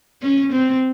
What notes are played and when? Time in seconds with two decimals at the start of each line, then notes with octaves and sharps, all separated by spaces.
0.22 C#4
0.52 C4